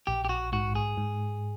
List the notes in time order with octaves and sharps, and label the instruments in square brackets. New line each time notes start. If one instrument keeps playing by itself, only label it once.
[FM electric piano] A#1 [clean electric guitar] G4
[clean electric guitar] G4
F#4
[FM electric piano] G#2 [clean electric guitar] F#4
[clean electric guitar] G#4
[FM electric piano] G#2